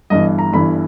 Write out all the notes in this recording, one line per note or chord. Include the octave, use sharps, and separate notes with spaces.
G1 G2 E3 D#5
A#5
G1 G2 E3 B5